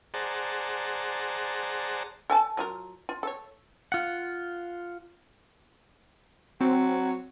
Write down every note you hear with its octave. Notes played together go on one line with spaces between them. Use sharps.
G#4 C5 D5 F#5 A5 A#5
A4 G#5 A5
F#3 F4 A#4
F4
A4 C#5
F4 F#5
F#3 C4